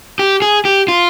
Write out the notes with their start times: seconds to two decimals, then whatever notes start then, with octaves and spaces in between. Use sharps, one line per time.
0.19 G4
0.42 G#4
0.65 G4
0.88 F4